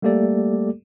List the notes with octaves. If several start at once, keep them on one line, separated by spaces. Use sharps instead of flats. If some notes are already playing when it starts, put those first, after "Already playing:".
G3 A3 A#3 G4 A4 D5